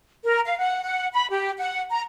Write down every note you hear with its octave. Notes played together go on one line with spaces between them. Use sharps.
A#4
F5
F#5
F#5
B5
G4
F#5
A#5